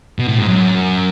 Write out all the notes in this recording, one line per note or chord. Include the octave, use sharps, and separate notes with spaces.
B2
A2
G#2
F#2